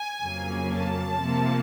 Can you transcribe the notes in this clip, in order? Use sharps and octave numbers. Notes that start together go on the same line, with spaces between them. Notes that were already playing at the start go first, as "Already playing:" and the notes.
Already playing: G#5
F2 C#3 F#3 A#3
A5
C3 F3 A#3